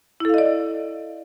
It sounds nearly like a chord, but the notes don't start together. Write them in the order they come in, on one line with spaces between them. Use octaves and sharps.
E4 A4 F5 D#5 D5